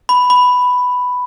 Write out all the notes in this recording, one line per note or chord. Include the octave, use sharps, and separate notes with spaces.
B5
B5